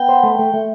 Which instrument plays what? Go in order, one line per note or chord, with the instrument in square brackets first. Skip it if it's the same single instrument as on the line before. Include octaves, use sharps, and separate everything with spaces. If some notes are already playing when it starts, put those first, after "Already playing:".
Already playing: [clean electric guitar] B3 [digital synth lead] G5
[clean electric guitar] C5
A3
A3
A3